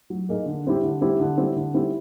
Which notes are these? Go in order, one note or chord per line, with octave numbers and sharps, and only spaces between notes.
F#3
A#3 D#4 G#4
D3
G3 C4 E4 G4
D3
G3 C4 E4 G4
D3
G3 C4 E4 G4
D3
G3 C4 E4 G4